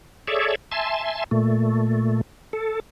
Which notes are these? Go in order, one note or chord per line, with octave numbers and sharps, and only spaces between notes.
G#4 A4 C#5 D5 E5
E5 G#5 A5 C6
A#2 A3
A4